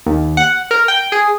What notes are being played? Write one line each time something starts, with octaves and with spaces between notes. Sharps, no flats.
D#2
F#5
A#4
G5
G#4